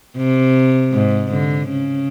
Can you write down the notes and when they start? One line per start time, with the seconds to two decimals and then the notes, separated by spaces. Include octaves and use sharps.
0.17 C3
0.92 G#2
1.30 D3
1.69 C#3